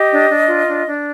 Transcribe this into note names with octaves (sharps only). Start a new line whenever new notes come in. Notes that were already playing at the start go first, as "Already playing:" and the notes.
Already playing: G4 D#5
D4
D4
F4
D4
D4